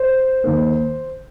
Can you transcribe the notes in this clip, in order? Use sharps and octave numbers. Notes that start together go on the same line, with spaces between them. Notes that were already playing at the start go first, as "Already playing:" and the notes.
Already playing: C5
D#2 D#3 A#3